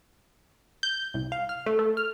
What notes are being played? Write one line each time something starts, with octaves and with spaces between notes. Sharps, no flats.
G6
C2
F5
F6
A3
A3
F6